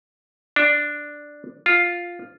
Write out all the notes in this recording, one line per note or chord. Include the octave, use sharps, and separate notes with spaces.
D4
F4